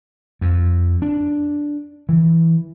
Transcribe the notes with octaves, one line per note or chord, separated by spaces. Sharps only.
F2
D4
E3